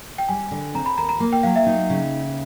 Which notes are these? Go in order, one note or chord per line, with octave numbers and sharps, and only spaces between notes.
G5
G3 G#5
D3
C4 A#5
B5
D#2 A#5
A#5
A#3
G5
F#3 F5
E5
D#4
C#3